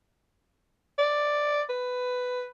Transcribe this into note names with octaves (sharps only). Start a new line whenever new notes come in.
D5
B4